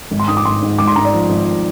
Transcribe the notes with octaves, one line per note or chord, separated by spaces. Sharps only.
G#1
C6
G#2 D#6
D6
G#1 C6
G#2
G#1 D6
C6
G#2 A#5
D5
F3
G#1